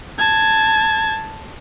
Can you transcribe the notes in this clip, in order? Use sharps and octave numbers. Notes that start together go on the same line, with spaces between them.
A5 G#6